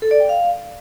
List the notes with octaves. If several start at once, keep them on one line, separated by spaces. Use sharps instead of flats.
A4
D5
G5
F5